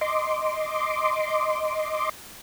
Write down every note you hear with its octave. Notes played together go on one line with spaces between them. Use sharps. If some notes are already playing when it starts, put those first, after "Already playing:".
D#5 C6 D6